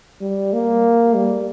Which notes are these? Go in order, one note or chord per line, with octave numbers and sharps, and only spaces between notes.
G3
A#3
G3